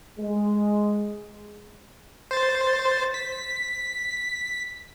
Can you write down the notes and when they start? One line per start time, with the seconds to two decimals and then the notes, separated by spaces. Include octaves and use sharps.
0.20 G#3
2.31 C5 A6
3.14 B6